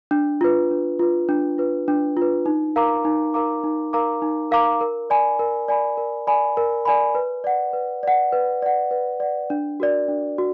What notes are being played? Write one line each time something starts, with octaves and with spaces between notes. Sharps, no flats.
D4
F4 B4
D4
F4 B4
D4
F4 B4
D4
F4
B4
D#4
A#4 F5 A#5 D6
D#4
A#4 F5 A#5 D6
D#4
A#4 F5 A#5 D6
D#4
A#4 F5 A#5 D6
A#4
D5 G#5 B5
A#4
D5 G#5 B5
A#4
D5 G#5 B5
A#4
D5 G#5 B5
B4
D5 F#5
B4
D5 F#5
B4
D5 F#5
B4
D5 F#5
D4
F#4 A#4 D5
D4
F#4